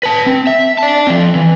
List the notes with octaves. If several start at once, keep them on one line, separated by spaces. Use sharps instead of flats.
B4 A5
C4
E5
D5 A5
F3 C4
E3